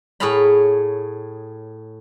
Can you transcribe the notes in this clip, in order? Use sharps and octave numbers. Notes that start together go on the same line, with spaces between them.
A2 G#4 C#5 F5 A#5 B5